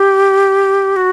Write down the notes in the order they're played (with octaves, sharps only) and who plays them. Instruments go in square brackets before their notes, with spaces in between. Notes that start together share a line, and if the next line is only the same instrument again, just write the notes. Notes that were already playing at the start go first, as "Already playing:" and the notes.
Already playing: [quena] G4
F#4